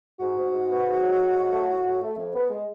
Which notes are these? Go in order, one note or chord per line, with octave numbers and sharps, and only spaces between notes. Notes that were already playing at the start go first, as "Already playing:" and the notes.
G#2 F#4
G#2
G#2
B3
G#2
F#3
G#2
F#3
A3
A2
A2
A3
F2
B3
G#3